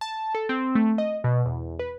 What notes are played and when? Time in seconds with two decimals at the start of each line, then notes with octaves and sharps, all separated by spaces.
0.01 A5
0.35 A4
0.49 C4
0.75 A3
0.98 D#5
1.24 B2
1.45 E2
1.79 B4